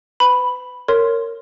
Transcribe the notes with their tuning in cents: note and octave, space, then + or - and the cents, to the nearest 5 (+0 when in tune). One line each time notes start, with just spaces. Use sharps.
B4 +35 B5 +0
A#4 -20 C#5 +0 C6 +0